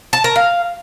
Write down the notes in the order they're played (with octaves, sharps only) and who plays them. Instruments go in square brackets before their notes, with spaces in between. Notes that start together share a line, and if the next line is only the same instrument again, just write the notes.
[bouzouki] A5
A#4
F5